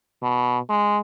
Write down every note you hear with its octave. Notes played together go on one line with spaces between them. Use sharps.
B2
G#3